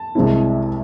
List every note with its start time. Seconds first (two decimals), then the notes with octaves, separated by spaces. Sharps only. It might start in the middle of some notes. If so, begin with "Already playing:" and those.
Already playing: A5
0.15 C2 C3 G#3 C4 E4